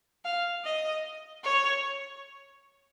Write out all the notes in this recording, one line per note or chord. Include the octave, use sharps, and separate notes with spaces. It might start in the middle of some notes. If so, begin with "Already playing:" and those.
F5
D#5
C#5